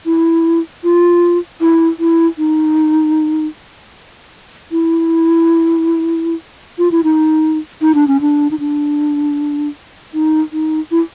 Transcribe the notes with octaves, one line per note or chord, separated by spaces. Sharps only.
E4
F4
E4
E4
D#4
E4
F4
E4
D#4
D#4
D4
C#4
D4
D#4
D4
D#4
D#4
E4